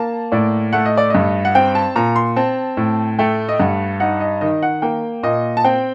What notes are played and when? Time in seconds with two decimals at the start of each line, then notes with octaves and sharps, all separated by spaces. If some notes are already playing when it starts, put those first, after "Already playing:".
Already playing: A#3 A5
0.32 A2 D5
0.73 A3 F#5
0.86 D#5
0.97 D5
1.10 G2 D#5
1.45 F#5
1.55 C4 G5
1.75 A5
1.96 A#2 A#5
2.16 C6
2.36 C4 A5
2.77 A2
3.19 A3 G5
3.49 D#5
3.60 G2 F#5
4.00 D#4 F#5
4.20 D#5
4.41 D#3 D#5
4.63 F#5
4.82 A#3 G5
5.23 A#2 D#5
5.57 A5
5.64 C4 G5